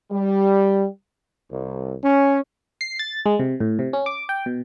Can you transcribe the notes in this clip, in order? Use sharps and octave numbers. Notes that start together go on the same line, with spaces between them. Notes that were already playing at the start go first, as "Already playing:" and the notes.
G3
C2
C#4
C7
A6
G#3
C3
A2
C3
C#4
D6
G5
B2